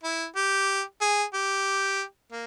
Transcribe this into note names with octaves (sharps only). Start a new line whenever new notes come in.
E4
G4
G#4
G4
A#3